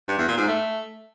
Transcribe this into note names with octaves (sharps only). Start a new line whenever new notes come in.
G2
E2
A#2
G#2
A3